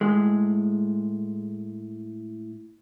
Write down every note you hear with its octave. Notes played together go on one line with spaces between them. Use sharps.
A2 G#3